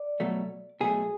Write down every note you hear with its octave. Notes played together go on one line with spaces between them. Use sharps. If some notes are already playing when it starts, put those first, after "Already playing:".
Already playing: D5
B2 F#3 A3
B2 F#3 A3 G#4